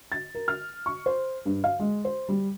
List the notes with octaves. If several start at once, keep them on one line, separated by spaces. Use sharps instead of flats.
A6
A#4
F6
C#6
C5
G2
F5
G#3
C5
G3